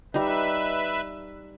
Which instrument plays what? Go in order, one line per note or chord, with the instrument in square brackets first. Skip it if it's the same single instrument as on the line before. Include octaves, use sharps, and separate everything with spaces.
[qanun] G3 D#4 [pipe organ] B4 E5